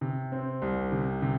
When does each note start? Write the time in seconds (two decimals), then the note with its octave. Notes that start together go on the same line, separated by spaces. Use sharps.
0.01 C3
0.32 C4
0.62 C2
0.92 C3
1.22 C3